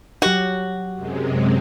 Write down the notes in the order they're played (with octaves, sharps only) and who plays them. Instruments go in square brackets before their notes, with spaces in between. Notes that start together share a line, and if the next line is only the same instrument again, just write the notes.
[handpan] F#3 G4 [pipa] F#4
[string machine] F#2 C3 G#3